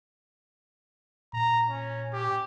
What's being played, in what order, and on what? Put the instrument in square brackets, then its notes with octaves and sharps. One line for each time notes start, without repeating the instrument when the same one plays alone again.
[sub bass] A#2 [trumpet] A#5
[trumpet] C#4
G4